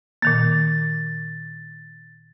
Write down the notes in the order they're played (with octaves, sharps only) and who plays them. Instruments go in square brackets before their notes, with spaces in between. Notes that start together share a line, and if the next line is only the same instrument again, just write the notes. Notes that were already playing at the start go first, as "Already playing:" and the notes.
[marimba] A#2 D#3 A#3 [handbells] A6